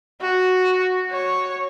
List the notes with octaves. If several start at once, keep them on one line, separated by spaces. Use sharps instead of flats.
F#4
C#5